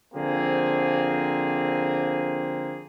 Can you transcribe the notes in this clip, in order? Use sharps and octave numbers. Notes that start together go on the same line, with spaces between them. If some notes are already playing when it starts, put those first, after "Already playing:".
D3 F3 A#3 C4 G#4